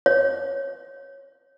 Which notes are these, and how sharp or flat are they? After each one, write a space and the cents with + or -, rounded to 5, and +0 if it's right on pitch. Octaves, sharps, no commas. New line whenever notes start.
C#5 -20